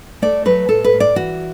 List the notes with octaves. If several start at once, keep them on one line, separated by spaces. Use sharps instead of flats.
A3 D5
F#3 B4
A2 A4
B4
A2
D5
E3 F#4